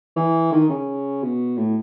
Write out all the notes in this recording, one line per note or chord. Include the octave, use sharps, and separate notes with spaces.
E3
D#3
C#3
B2
A2